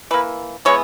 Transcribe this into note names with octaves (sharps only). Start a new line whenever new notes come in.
E3 A#3 B4
E3 G#3 B3 C#5